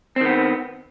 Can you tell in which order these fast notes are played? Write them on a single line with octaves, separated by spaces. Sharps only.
C4 D#3 B3